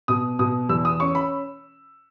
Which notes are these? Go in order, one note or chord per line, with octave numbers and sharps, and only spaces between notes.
B2 D#6
B2 D#6
E2 E6
D#6
C#4 C#6
B5